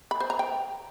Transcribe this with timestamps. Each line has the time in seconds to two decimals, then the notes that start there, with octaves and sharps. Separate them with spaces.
0.11 B5
0.20 C5
0.30 A#5
0.39 G5